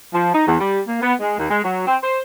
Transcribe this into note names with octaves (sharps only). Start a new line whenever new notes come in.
F3
D#4
E2
G3
A#3
B3
G#3
D#2
G#3
F#3
C4
C5